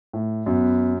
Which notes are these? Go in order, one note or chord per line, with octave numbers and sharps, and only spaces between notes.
A2
F#2 B3